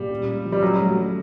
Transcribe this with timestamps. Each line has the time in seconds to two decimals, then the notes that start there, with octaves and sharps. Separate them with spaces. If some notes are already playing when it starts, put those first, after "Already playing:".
Already playing: A#2 G3
0.10 C#4
0.28 G#3
0.45 F3
0.52 G3
0.62 F#3 C#4
0.79 A3
0.96 F#3